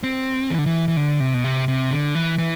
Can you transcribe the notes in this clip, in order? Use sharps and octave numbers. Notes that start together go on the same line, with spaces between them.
C4
E3
D3
E3
E3
D3
C3
B2
C3
C3
D3
E3
E3